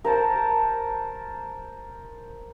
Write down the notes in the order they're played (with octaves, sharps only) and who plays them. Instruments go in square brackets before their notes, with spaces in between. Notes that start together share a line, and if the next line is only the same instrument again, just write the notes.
[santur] A#4 C5 A5